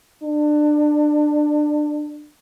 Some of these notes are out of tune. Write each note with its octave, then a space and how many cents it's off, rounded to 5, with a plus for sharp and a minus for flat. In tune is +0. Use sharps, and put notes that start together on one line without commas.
D4 +25